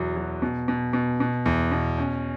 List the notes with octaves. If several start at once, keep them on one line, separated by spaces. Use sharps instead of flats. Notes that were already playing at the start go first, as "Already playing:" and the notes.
Already playing: E2 B2 F#3
F#3
B2
B2
B2
B2
E2
B2
C#4